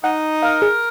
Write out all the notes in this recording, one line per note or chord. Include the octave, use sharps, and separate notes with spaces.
D#4 F#5
A#4 F5
G#4